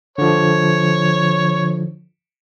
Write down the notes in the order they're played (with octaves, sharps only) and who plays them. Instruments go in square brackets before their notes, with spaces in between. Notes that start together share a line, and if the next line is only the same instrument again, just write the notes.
[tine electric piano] D3 F3 [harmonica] C#5